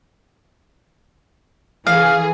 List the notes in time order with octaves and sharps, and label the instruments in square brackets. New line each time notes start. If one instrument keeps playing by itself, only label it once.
[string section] E3 G#4 [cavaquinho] F5